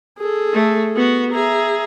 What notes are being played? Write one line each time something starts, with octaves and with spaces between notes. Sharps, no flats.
G#4 A4
A3
B3 F#4
G#4 E5 A#5